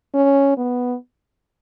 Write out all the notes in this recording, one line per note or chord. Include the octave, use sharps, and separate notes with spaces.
C#4
B3